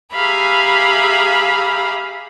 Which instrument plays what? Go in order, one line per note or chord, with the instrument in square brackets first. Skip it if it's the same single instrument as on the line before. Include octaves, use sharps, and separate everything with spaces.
[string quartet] G4 G#4 E5 F5 A#5 B5